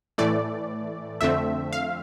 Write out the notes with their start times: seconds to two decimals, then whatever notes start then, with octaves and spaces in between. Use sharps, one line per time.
0.18 A2 E3 A3 D5
1.21 F2 D3 A3 C4 E5
1.73 F5